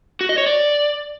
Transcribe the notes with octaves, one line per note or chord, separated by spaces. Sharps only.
F#4
D#5
C#5
D5